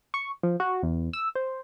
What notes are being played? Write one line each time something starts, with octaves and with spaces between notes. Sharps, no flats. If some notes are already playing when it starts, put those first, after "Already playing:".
C#6
F3
F#4
E2
E6
C5